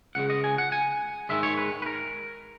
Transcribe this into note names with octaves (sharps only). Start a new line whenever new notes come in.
C#2 C#3 G#3 F#5
D#5
G#5
F#5
G#5
G#2 D#3 G#3 E5
C#5
B4
B4
A#4